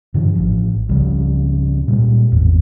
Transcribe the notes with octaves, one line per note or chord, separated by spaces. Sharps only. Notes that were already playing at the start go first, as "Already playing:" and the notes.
G2 D3 E3
A1 F3
C#2 C#3 F3 G3
A#2 G3 G#3
G#1 E2